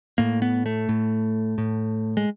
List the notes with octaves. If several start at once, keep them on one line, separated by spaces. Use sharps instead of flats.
A2 A#3
B3
A3
A2
A2
G#3